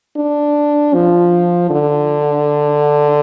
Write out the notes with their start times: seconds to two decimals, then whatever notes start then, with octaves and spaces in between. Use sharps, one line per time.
0.17 D4
0.94 F3
1.70 D3